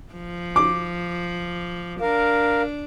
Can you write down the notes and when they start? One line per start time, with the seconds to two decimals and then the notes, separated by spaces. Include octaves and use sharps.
0.13 F3
0.56 D6
2.01 D4 A#4 F5